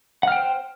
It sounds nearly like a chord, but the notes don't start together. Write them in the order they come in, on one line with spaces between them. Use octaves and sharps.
F#5 F6 G5 C5